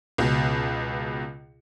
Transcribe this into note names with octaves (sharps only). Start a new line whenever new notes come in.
C#2 B2